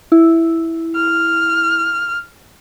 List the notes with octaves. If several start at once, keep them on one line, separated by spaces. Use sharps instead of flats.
E4
F6